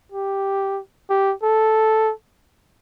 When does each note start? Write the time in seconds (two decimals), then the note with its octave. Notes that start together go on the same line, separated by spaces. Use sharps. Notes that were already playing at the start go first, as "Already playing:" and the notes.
0.12 G4
1.10 G4
1.43 A4